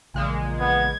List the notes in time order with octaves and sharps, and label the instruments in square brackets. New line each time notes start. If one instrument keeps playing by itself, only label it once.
[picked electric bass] A#1 C#3 E3 [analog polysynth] A#2 G#3 A#3
[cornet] B3 [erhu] G#6